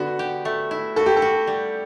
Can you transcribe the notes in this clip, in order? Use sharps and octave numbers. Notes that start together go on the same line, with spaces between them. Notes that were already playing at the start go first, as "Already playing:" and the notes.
Already playing: D3 B3 F#4
G4
A3
E4
F#4 A4
G4
A4
F#4
G3